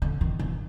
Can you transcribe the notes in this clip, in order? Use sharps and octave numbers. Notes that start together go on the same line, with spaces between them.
D3
D#3
D#3